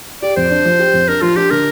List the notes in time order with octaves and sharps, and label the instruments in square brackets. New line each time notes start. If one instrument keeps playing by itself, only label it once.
[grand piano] G4 [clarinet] D5
[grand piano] F2 [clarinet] C5
[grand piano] D4
F3
G4
F2
[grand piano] D4 [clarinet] A#4
[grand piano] F3 [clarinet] F4
[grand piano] D4 [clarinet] G4
[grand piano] D3 [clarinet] A#4